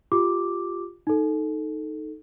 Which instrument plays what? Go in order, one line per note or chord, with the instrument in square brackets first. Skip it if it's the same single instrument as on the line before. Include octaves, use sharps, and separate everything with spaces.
[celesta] F4 G4 D6
D#4 A4